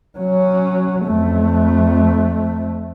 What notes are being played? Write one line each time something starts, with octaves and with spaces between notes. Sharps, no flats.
F#3 C#4
F2 A3